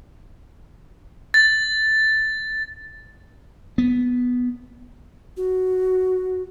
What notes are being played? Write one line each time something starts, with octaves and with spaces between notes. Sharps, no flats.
A6
B3
F#4